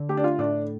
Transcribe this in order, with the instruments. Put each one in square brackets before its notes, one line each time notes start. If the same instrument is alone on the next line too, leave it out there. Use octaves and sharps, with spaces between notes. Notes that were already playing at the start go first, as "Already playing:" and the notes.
Already playing: [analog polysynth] D3
[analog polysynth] A3 [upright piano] G4
[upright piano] D4
F4
[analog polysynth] A2 [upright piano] D4